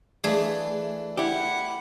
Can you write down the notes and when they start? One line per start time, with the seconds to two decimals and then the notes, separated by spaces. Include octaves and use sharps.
0.24 E3 A3 D4 G#4
1.17 E4 G4 F#5 B5